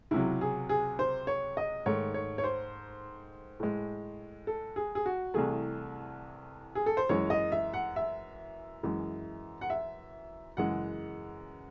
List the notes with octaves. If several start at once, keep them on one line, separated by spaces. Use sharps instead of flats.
C#2 C3 F#3 E4
G#4
G#4
C5
C#5
D#5
G#2 D#3 A3 C#5
C#5
C#5
C5
A2 G#3
A4
G#4
G#4
F#4
C2 C3 E3 A3 G#4
G#4
A4
C5
F#2 E3 G#3 C#5
D#5
E5
F#5
E5
F#2 E3 G#3
F#5
E5
F#2 C#3 E3 G#3 F#5